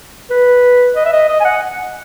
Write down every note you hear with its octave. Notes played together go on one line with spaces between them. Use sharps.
B4
D#5
E5
D#5
D#5
G#5
F#5